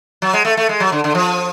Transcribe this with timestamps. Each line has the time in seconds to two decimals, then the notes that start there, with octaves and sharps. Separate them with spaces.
0.22 F#3
0.33 G#3
0.45 A3
0.57 A3
0.69 G#3
0.80 F#3
0.92 D3
1.04 D3
1.15 F3